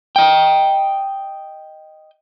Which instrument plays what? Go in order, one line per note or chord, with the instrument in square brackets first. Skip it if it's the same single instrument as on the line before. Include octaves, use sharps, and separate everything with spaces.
[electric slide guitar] D#5 G5